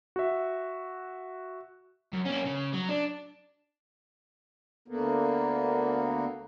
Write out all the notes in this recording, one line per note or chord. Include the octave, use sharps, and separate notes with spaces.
F#4 E5
F#2
A#3 C#4
C#3
F#3
D4
D2 D3 A#3 B3